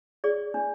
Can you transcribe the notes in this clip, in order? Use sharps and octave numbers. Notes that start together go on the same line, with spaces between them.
G#4 D5
D4